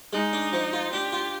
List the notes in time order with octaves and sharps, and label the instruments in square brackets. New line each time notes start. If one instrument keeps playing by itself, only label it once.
[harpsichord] G#3 [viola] D#4
[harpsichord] D4
F3
F4
[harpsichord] D4 [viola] G4
[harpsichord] F4